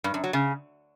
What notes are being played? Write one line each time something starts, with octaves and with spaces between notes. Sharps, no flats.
G2
F#2
F#3
C#3